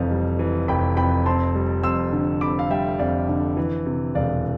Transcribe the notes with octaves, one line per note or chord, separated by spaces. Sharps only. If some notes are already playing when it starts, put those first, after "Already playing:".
Already playing: F1 F2 E3 F5
G3
E3
F1 G5 B5
F2 G5 B5
C4 A5 C6
G3
F2 C6 E6
D3
C4 B5 D6
F5
G3 E5 G5
F2 D5 F5
D3
E3
C3
E1 D5 F5